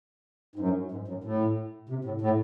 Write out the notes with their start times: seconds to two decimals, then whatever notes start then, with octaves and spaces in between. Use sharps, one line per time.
0.56 G#2
0.59 F#2
0.92 G#2
1.08 F#2
1.24 A2
1.89 C3
2.05 A2
2.21 A2